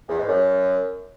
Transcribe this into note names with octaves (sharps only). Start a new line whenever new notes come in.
E2
G#2
F#2